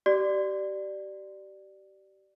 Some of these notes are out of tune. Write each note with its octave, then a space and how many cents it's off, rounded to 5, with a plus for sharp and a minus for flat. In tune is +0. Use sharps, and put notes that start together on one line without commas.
G4 -30 D5 +10